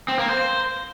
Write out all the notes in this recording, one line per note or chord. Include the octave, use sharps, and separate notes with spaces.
C4
A#3
C5